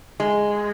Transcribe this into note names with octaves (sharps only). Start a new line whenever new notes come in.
G#3